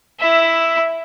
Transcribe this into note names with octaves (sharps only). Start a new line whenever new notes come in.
E4 E5